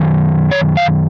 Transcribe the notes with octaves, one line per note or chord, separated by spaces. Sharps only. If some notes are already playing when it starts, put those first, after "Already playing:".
Already playing: F#2 D#3
C#5
F5